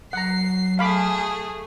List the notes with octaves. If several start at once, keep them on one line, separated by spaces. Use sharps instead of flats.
F#3 F#5 A#5 C7
A3 G#4 F5 B5 D6